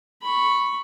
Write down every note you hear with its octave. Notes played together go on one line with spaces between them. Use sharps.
B5 C#6